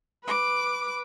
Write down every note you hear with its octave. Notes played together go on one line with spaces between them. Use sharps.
B4 D6